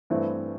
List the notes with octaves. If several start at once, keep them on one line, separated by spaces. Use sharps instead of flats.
G2 E3 A3 C4